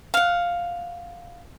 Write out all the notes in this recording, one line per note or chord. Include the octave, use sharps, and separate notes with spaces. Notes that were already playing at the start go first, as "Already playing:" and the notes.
F5 F#5